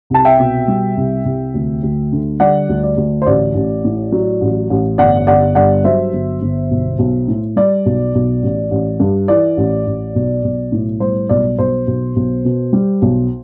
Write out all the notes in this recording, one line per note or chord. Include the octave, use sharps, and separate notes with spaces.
C2 A5
E5 G5
B2
G3
C2
C2
D2
D2
D3
G3 D5 F#5
D2
D5
D2
C5
A1 D5
A1
A2
F#3
A1
A1
G1 D5 F#5
G1 D5 F#5
G2 D5 F#5
F#3 C5 E5
G1
G1
B1
B1
A2
G3 D5
B1
B1
A1
A1
G2
E3 D5
A1
A1
B1
B1
A2
G3 C5
B1 D5
B1 C5
B1
B1
B2
G3
B1